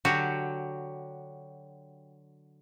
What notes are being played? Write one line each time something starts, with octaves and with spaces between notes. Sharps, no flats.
D3 F#3 F#4 G4